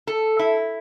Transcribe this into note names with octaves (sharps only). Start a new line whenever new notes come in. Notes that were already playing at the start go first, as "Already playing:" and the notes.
A4
E4